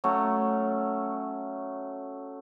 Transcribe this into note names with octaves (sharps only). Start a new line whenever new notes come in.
F#3 A3 C#4